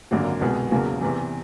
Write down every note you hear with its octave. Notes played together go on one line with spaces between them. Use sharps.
G#1 F#2 D3 F#3 A#3
C2 B2 G#3
E1 E2 C#3 F#3 A#3
E2 C3 E3